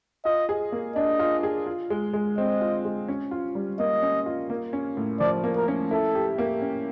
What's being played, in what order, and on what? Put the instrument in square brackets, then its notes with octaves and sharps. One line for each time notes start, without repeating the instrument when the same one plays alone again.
[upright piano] F4 [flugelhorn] D#5
[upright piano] G#4
A#3
[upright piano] D4 [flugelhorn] D#5
[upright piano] F4
G#4
F4
G#3
G#3
[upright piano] C4 [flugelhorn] D#5
[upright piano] F4
G#3
C#4
F4
G3
[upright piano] A#3 [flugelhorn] D#5
[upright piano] C#4
F4
A#3
C#4
A2
[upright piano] F3 [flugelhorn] D5
[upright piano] A#3
[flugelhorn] A#4
[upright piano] C#4
[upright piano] E4 [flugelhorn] A4
[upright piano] G4
A#3
C#4